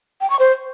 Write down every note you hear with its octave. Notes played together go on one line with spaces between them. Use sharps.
G5
C#6
C5